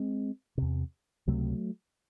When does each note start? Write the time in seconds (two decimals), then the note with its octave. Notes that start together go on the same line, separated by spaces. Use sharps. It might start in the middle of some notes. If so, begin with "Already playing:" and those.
Already playing: G#3 C4
0.58 E2 C3
1.28 C#2 C3 F#3 A3